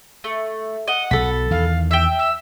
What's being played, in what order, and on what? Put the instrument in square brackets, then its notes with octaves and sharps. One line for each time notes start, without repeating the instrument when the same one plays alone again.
[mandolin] A3
[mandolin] D#5 [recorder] F#5
[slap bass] B1 E3 F#3 [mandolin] A4 B5
[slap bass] E2 D#3 [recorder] F5
[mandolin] E5 G5 [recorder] E6
[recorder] E6